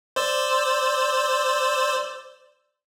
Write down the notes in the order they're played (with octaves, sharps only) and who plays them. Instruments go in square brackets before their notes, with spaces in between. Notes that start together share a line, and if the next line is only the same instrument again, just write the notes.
[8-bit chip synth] C5 D5 E6